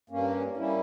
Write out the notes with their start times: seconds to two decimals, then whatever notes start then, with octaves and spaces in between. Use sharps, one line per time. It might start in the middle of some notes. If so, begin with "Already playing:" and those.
0.10 G2 A#3 C#4
0.57 G3 A#3 C#4 E4